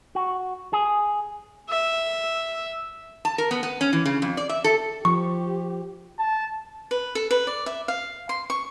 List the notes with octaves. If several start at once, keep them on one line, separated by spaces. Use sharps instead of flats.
F#4
G#4
E5
A5
A#4
B3
B3
C#4
E3
C#3
F2
D5
E5
A4
F3 G4 C#6
A5
B4
A4
B4
D5
E5
F5
C6
C#6